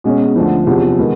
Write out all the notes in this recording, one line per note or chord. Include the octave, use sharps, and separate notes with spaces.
B2 G#3 C#4
D2 D3 F3
E2 C3 F3
D#3 G#3 B3